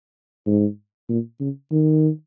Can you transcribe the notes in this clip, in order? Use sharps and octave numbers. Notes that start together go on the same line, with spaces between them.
G#2
A#2
C#3
D#3